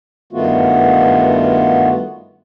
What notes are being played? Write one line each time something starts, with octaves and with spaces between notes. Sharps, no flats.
G2 D#3 A3 B3 F4 F#4